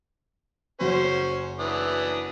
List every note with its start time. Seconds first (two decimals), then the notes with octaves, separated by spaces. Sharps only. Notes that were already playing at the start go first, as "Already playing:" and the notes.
0.80 F#1 F#2 C#4 F#4 C5
1.59 E3 D4 D#6